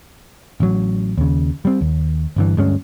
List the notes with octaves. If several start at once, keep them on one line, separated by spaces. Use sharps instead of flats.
A1 F#3
D#2 C#3
G3 C4
D#2
G1 G2 E3
D2 G2 G#3 C#4